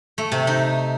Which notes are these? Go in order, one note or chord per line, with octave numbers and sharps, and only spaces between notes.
A3
C3
D#4